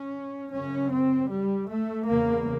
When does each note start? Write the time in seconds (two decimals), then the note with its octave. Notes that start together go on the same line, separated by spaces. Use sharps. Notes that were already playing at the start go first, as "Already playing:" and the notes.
Already playing: C#4
0.53 F#2 C#3 C#4
0.91 C4
1.30 G3
1.69 A3
2.08 E2 C#3 A#3